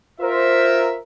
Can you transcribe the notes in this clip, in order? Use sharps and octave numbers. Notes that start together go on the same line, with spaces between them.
F4 A#4 C5 E5